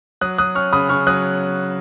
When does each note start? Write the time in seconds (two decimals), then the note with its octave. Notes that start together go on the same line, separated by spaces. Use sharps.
0.21 F#3 D#6 F#6
0.38 F#3 D#6 F#6
0.55 C#4 C#6 F6
0.73 C#3 B5 D#6
0.89 C#3 C#6 F6
1.07 F#3 D#6 F#6